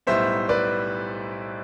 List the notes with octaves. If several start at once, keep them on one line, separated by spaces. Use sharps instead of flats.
B1 A2 G3 B3 C5 E5
B4 D5